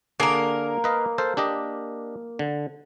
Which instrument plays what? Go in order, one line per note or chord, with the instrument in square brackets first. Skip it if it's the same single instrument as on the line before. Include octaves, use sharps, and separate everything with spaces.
[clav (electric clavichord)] D3 D4 G#4 [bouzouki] A#3 A#4
[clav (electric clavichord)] B4 D#5 F5
A4 C5 F5
D4 G4 D#5
D3